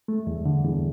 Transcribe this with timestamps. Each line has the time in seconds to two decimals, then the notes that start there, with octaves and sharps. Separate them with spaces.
0.08 A3
0.27 E2
0.45 D3
0.64 E2